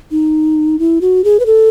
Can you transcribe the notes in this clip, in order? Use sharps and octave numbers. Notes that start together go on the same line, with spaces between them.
D#4
E4
F#4
G#4
B4
A4